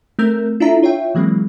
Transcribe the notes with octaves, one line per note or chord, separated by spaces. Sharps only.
A3 C4 A#4 E6 G6
D4 E4 F4 A4 E5 A#5
F4 C#5 E5 G5
E3 F#3 G#3 A#3 C4